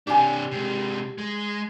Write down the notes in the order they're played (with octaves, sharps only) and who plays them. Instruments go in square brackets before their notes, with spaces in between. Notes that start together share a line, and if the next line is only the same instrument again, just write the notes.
[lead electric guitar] C3 D4 [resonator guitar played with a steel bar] G4 G#5
[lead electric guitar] C3 G#3
G#3